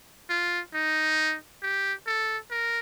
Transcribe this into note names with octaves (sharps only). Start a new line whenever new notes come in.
F4
D#4
G4
A4
A#4